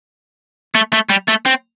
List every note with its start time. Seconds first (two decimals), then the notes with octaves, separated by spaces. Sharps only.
0.75 A3
0.93 A3
1.10 G3
1.28 A3
1.46 C4